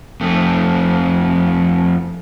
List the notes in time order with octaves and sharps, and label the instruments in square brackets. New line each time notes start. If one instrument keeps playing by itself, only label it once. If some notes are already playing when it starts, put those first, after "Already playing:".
[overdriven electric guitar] F2 A3